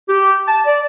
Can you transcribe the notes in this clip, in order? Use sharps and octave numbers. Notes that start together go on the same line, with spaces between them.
G4
A5
D5